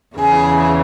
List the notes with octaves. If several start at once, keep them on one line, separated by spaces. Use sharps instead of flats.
E2 C#3 E3 G#4